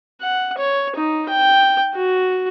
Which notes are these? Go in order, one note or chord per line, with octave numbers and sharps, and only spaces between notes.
F#5
C#5
D#4
G5
F#4